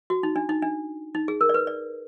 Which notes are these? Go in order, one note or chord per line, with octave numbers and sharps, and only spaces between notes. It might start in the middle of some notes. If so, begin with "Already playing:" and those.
F#4
D#4
D4
D#4
D4
D#4
G#4
A#4
D5
B4
D5